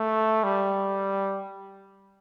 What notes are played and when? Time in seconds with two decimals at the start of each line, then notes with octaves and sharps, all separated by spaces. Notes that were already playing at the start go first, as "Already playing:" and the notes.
Already playing: A3
0.44 G3